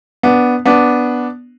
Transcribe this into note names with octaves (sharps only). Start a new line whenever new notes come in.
B3 D4
B3 D4